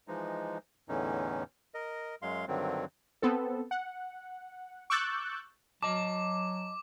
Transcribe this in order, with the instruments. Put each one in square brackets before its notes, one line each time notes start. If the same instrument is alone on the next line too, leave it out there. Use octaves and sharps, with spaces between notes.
[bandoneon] E3 F3 G#3 D#4
E2 A2 D3 E3 C#4 D#4
A#4 D#5
F#2 F#3 G#3 F5 C6
G2 D3 D#3 F#3 C4
[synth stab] B3 C4 A4
F#5
C#6 D6 E6 F#6 G6 A6
[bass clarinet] F#3 [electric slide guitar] D#5 A5 [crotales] D6